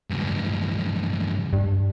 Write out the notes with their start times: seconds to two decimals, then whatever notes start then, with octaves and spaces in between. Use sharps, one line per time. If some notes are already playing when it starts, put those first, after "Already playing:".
0.10 C#2 G2
1.53 G2